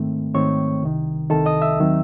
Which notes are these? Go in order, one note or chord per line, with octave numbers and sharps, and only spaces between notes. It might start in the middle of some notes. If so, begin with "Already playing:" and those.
Already playing: G#2 D#3 A3 C4
G#2 D#3 A3 C4 C#5 C#6
C2 C3 D#3
C2 C3 D#3 A4 A5
D#5 D#6
E5 E6
D#2 D#3 F#3 C4